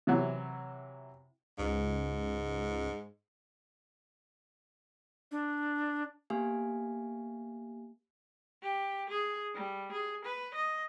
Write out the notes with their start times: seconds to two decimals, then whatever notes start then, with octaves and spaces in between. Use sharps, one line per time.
0.07 C3 E3 F#3
1.59 C#2 G#2
5.31 D4
6.30 A#3 B3 G4 F5 G#5
8.63 G4
9.09 G#4
9.55 G3
9.92 G#4
10.25 B4
10.55 D#5